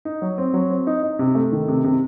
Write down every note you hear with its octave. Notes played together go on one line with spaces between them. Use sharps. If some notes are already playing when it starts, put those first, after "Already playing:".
D#4
F#3
C4
F#3
C4
D#4
D#4
C3
A3
D#3
C3
C3